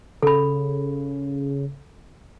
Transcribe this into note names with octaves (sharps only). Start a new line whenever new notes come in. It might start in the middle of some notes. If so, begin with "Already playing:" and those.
C#3 A4 B5